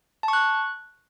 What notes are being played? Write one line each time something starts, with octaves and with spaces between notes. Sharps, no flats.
A5
C#6
F#6